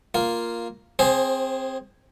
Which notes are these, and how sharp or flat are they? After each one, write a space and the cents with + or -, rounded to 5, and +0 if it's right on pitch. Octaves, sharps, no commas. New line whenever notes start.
A#3 +0 F4 +0
C4 +0 G#4 +0 C5 +30